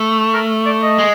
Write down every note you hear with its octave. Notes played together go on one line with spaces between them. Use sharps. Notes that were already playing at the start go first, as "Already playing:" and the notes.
Already playing: A3
A#4
D5
D#5
G#3